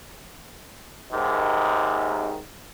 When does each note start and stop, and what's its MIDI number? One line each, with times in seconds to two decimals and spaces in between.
1.13 2.38 39
1.13 2.38 44
1.13 2.38 48
1.13 2.38 51